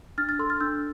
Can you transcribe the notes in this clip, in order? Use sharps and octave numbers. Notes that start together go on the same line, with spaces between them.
D4 F6 A6
F6 A6
A4 C6 E6
F6 A6
D4 E6 G6